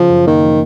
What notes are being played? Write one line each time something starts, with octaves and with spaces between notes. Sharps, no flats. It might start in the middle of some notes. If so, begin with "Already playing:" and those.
Already playing: C#3 F3
F#2
D#3 A#3
F3